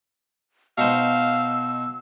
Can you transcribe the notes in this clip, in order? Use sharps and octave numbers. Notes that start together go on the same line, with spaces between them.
B2 D#4 C5 F5 E6